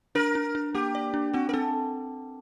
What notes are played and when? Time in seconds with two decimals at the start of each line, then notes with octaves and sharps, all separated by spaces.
0.15 D4 A#4
0.35 D4
0.55 D4
0.75 A#3 G4
0.95 D5
1.14 D4
1.33 C4 F#4
1.49 A#4
1.53 C4 A4